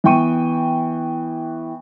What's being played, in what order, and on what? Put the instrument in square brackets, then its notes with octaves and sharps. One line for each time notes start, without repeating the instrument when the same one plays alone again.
[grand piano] E3 B3 G5 C#6 D#7